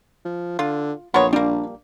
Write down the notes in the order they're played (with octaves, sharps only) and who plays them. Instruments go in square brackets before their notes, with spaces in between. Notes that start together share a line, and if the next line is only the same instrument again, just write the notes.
[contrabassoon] F3
[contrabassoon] D3 [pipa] F4
[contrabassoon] A#1 [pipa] B3 A#4 C#5 [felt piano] C6 C#6 D#6
[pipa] G3 A#3 [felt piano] D4